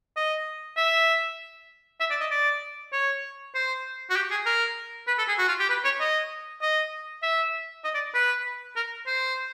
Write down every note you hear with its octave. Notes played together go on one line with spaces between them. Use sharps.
D#5
E5
E5
D5
D#5
D5
C#5
C5
F#4
G4
G#4
A#4
B4
A4
G#4
F#4
F4
G4
B4
C#5
D#5
D#5
E5
D#5
D5
B4
A#4
C5